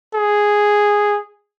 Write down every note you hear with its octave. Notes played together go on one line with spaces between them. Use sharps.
G#4